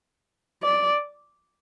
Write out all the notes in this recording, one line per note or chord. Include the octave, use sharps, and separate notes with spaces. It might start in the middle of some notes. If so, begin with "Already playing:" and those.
D5